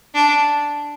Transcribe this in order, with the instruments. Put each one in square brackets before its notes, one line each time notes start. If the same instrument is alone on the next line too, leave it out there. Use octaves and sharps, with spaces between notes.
[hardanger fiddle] D4